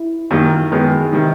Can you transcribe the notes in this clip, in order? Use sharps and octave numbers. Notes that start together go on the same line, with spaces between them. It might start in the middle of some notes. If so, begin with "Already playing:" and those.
Already playing: E4
F#2 D#3 G3 A#3
F#2 D#3 G#3 B3
C3 D#3 G3 D#4